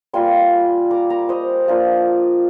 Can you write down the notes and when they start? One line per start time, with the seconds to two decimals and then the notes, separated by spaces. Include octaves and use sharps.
0.13 G3 A#3 F4 G#5 C6
0.90 A#5 D6
1.10 A#5 D6
1.29 C5 D#5
1.68 A#3 D4 F4